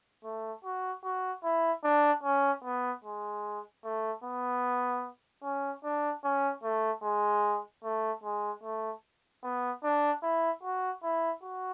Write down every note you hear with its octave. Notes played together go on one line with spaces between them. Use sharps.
A3
F#4
F#4
E4
D4
C#4
B3
G#3
A3
B3
C#4
D4
C#4
A3
G#3
A3
G#3
A3
B3
D4
E4
F#4
E4
F#4